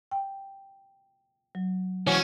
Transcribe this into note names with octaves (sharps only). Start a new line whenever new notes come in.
G5
F#3
E3 C#4 F#4